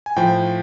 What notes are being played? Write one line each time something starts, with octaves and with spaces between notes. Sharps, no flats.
G#5
A2 F3 G5